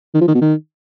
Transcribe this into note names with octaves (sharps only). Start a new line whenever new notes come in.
D#3
F3
D#3
B2
D#3